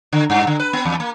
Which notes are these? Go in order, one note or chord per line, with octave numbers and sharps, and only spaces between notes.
D3
G2
D3
B4
B3
E2
A#3